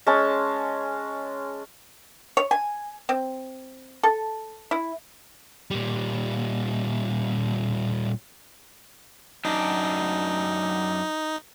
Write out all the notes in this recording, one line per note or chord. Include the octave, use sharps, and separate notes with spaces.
G#3 C#4 A5
C#5
G#5
C4
A4
E4
A#2 G3
F#2 D4 D#4